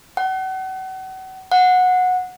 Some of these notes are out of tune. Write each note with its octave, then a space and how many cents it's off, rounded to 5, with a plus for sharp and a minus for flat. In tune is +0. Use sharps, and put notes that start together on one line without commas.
F#5 +35
F#5 -15